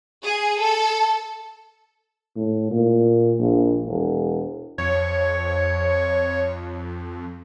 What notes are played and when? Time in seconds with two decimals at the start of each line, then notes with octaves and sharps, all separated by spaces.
0.23 G#4
0.60 A4
2.36 A2
2.71 A#2
3.39 A#1
3.87 E1
4.78 F2 C#5